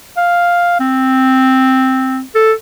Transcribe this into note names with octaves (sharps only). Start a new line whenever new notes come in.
F5
C4
A4